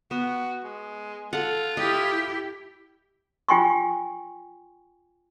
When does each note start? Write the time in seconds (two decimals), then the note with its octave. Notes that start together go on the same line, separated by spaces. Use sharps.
0.11 B3 F#4
0.64 G#3
1.33 F4 A4 F#5
1.77 E4 G4 D#5
3.49 F4 G5 G#5 C6 C#6